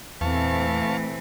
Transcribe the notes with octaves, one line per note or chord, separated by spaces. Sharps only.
E2 A#2 E3 A3 C4 F5 A5 C#6